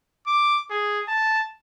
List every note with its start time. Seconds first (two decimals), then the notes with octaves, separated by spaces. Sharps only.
0.27 D6
0.71 G#4
1.08 A5